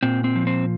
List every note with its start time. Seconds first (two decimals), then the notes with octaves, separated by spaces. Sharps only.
0.03 A#2 C4
0.24 C4
0.36 F3
0.47 C4